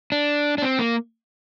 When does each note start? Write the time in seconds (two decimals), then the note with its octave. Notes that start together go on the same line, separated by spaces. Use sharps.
0.12 D4
0.58 D4
0.62 C4
0.79 A#3